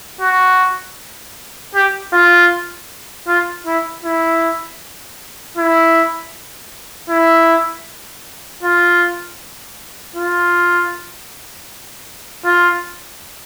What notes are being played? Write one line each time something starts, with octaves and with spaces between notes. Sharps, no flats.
F#4
G4
F4
F4
E4
E4
E4
E4
F4
F4
F4